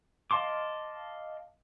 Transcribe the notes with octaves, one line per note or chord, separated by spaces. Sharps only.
D#5 F5 A5 C6 D6